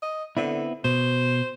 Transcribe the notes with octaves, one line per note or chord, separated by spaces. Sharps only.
D#5
D3 B3 C4 E4
B2 C5